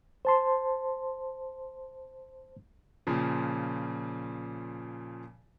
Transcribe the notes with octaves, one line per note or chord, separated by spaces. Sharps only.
C5 A5 C6
A#2 C#3 F3